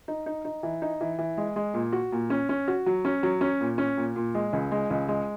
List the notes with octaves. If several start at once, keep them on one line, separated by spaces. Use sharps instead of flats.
D#4
D#4
D#4
E3
D#4
E3
E3
G#3
G#3
A#2
F#4
A#2
C#4
C#4
F#4
F#3
C#4
F#3
C#4
A#2
C#4
A#2
A#2
G#3
C#2
G#3
C#2
G#3